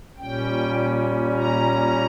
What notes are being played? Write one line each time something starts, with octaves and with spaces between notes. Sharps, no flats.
A#2 G3 C#4 G5
A#5